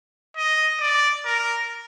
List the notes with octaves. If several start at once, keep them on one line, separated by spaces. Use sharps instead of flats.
D#5
D5
A#4